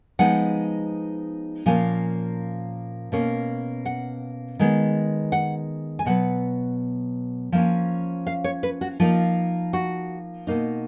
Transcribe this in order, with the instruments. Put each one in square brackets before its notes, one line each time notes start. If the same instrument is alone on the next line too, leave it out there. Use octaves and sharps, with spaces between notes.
[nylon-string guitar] F3 G#3 B3 D#4 F#5
A#2 F3 A#3 C#4 G#5
B2 A#3 C#4
F#5
D#3 G#3 B3
F#5
G#5
B2 F#3 B3 F#5
F3 A#3 C#4
F5
C#5
B4
F#4
F3 A#3 D#4 F4
F#4
B2 A#3 D#4